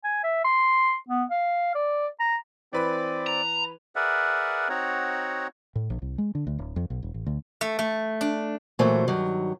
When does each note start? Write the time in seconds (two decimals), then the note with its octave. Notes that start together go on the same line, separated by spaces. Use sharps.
0.04 G#5
0.24 E5
0.44 C6
1.09 B3
1.31 F5
1.75 D5
2.20 A#5
2.73 E3 C4 B4 D5 B5
3.27 A#5
3.96 G#4 A#4 B4 D5 E5 F#5
4.69 C4 D#4 F#4 C#5 F#5 A#5
5.76 A2
5.90 A#1
6.02 C2
6.18 G#3
6.35 D3
6.47 D2
6.59 D1
6.76 F2
6.90 B1
7.03 E1
7.14 A1
7.27 D2
7.61 A3
7.79 A3
8.21 D4
8.79 A#2 E3 F#3 A3 C5
9.08 G2 D#3 F#3